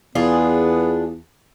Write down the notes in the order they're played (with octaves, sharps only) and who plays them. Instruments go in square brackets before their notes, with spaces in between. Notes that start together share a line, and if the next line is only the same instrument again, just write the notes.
[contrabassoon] E2 [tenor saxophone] B3 [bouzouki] D4 F4 G#4